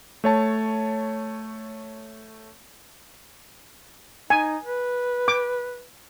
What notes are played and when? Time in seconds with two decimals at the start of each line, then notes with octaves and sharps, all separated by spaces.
0.24 A3 C#5 A5
4.30 D#4 G#5
4.63 B4
5.28 D6